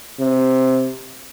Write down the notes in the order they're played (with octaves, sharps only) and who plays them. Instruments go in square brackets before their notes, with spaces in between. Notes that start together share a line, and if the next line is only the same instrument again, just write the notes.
[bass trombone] C3